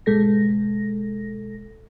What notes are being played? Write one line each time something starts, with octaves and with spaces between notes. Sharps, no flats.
G#1 B2 G#3 A4 A#6